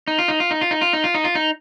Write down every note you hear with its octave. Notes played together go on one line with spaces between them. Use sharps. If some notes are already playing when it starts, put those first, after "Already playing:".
D#4
F4
D#4
F4
D#4
F4
D#4
F4
D#4
F4
D#4
F4
D#4